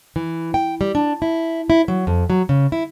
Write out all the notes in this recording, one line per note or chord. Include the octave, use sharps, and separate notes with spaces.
E3
G5
G3
D4
E4
E4
F#3
F2
F#3
C#3
E4